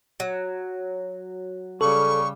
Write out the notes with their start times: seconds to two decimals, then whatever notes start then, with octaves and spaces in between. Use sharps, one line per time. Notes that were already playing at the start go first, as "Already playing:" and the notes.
0.20 F#3
1.81 C#3 G3 A4 C#6